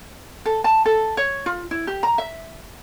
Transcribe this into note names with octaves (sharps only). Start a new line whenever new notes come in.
A4
A5
A4
C#5
F4
E4
G4
A#5
E5